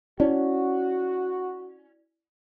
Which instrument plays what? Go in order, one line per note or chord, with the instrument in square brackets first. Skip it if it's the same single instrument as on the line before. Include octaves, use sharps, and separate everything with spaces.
[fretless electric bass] C#4 [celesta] E4 D5 [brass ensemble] F#4